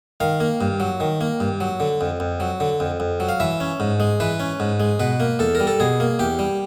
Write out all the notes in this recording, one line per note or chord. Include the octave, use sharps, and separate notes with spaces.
D#3 F5
A#3
G2
F#3
D#3
A#3
G2
F#3
D3
F2
F2
F#3
D3
F2
F2
F#3
F5
E3 E5
C#4
G#2
G#3
E3 B4
C#4
G#2
G#3
B2 B4
A#3
E2 A4
A#4
G3
A4
B2 G#4
A#3
E2 G4
G3